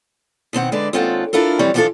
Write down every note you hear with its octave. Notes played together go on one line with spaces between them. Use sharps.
B2 D#3 C4 F#5
D3 G#3 B4 D5
D#2 G#3 C4 F4 A4 F#5
D4 E4 F4 A4 A#4
F2 E3 G3 C4 C#5
E3 F3 D4 E4 F4 A4